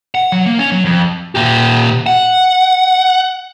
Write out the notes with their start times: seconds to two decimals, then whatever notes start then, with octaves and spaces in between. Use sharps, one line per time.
0.15 F#5
0.32 F#3
0.46 A#3
0.59 C#4
0.72 F#3
0.85 F2
1.35 A#2 G4
2.06 F#5